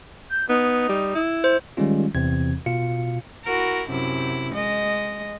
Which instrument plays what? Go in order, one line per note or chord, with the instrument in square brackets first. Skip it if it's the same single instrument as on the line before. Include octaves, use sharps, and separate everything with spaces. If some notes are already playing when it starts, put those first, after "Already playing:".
[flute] G6
[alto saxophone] B3 [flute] D#4
[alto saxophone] G3
E4
[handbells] C5
[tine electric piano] D#3 G3 G#3 C#4 F4
E2 C3 E3 C4 G#6
B2 F4 F5 C#7
[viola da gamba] E4 F#4 A#4
F#2 C3 E4
G#3 D#5